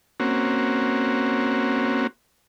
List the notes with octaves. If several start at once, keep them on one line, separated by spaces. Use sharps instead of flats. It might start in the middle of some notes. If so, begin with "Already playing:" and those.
A#3 C4 C#4 F#4